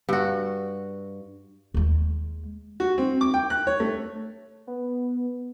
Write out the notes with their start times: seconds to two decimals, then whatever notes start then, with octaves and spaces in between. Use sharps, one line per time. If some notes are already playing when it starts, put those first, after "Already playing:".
0.09 G2 F#4
1.74 D#2 G#3
2.80 F#4
2.98 C4
3.21 D6
3.34 G5
3.50 F#6
3.67 C#5
3.80 A3
4.67 B3